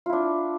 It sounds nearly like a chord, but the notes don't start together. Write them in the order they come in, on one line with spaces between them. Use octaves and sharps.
F4 E4 D4